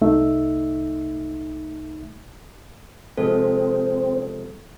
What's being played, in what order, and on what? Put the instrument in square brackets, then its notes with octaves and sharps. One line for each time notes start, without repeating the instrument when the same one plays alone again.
[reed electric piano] C2 A3 D#4 E5
[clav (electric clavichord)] C3 F3 G#3 [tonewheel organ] C4 [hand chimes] A4